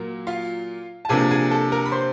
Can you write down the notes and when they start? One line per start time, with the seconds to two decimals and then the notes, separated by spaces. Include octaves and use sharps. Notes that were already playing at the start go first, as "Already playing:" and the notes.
Already playing: A#2 F#3 A#3
0.27 F4 F5
1.05 A5
1.09 C3 F3 A#3 D4 G#4 G#5
1.31 G#4 G#5
1.51 A4 A5
1.72 A#4 A#5
1.86 B5
1.92 C5 C6